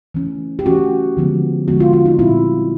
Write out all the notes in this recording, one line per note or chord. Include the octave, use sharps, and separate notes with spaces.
E3 A3 C#4
G4
E3 A3 C#4 F#4
D3 F3 G#3 B3
D3 F3 G#3 B3 F#4
F4
F4
D#4
A#2 G3 C4 E4